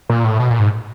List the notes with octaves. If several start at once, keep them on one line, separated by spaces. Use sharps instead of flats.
A#2
A2
B2
A#2
G#2